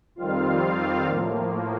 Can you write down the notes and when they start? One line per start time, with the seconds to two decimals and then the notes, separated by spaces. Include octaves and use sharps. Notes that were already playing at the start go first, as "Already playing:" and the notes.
0.16 F2 D#3 G3 C4 F4 F5
1.07 A2 F3 A#3